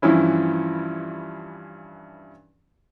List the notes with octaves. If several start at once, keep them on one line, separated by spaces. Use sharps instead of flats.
G2 E3 F3 C#4 E4